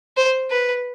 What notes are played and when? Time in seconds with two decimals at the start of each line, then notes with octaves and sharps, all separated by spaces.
0.17 C5
0.51 B4